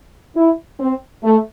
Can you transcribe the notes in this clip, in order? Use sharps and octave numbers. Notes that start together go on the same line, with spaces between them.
E4
C4
A3